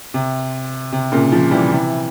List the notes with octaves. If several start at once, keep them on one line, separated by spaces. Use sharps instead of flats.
C3
C3
A#2 C#3
C#3 F3
E3 G3
C3 E3